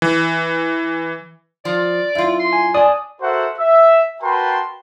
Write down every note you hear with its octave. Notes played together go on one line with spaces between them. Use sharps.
E3
F3 D5
F#2 E4 F4
C6
G#5
D4 D5 G#5 D#6
F#4 A4 A#4 C5 E5 F#5
E5
F#4 A#4 B4 G5 A5 C6